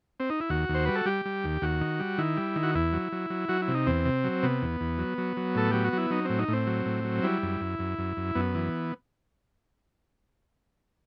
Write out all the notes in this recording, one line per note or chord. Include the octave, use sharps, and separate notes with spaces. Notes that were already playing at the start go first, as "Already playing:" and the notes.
C4
D#4
E4
D#2 F#4
D#2
C5
G3 B4
A4
G3 G4
G3
D#2
D#2 F#4
D#3
G3
D#3 E4
G3
D#3
F#4
E2 E4
F#3
F#3
F#3
F#3 F#4
E4
C3
D#4
E2 C4
C3
F#3
C3 B3
E2
E2
F#3
F#3
F#3
A2 A4
F#3 G4
F#4
F#3 E4
F#3 D#4
A2 C4
D#4
A2
C4
F#3
A2
F#3
G3 E4
F#2
F#2
F#2
F#2
F#2
F#2 B3
E3